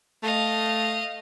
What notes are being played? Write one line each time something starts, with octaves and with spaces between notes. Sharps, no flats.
A3 D#5 F5